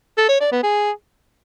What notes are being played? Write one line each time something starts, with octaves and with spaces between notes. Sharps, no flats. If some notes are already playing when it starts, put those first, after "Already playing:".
A4
C#5
D5
B3
G#4